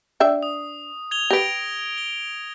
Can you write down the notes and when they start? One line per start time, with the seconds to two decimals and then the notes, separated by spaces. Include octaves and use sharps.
0.20 D4 E5 G5
0.43 D#6
1.11 G#6 F7 G7
1.30 G4 B4 A#6 D7
1.98 G7